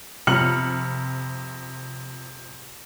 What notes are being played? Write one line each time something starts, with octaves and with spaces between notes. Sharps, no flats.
F2 C3 F6 C#7 F#7